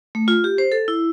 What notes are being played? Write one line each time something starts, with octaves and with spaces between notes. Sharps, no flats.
A3
F4
G4
C5
A4
E4